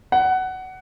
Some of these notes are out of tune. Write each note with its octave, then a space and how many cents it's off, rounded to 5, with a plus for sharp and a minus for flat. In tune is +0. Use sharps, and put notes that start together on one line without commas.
F#5 +15